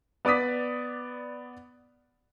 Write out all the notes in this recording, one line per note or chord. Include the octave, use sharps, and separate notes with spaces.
B3 D5 D6 D#6 B6